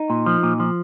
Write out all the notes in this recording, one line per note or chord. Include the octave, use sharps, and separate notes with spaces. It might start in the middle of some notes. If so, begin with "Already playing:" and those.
Already playing: D#4
A#2
F3
A#2
F3